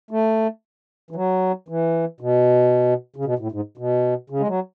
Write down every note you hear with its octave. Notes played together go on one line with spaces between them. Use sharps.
A3
E3
F#3
E3
B2
C#3
B2
A2
G#2
B2
C#3
G#3
F#3